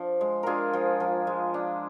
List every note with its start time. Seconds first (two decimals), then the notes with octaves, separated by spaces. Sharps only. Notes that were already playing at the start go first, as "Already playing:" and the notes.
Already playing: F3 D4
0.21 G#3
0.43 D4 F4 G#4 A#4
0.73 F3
1.00 F3
1.27 G#3
1.54 D4